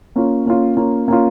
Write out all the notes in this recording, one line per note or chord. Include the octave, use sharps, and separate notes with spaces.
A#3 C#4 F4
A#3 C#4 F4
A#3 C#4 F4
A#3 C#4 F4